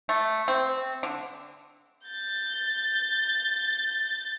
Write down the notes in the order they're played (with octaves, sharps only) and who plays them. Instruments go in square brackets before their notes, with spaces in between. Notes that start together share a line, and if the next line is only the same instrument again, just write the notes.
[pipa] A3
C4
D3
[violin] G6 A6